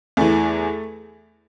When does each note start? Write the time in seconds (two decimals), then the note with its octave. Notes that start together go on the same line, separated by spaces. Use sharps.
0.17 E2 E3 A3